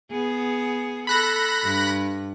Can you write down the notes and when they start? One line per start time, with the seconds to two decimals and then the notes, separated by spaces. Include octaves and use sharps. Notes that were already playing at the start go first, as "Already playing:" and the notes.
0.11 B3 G#4
1.07 A4 B5 F#6 A#6
1.64 G2